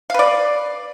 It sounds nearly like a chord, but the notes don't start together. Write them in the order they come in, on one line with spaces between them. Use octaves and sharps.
F5 B4 D5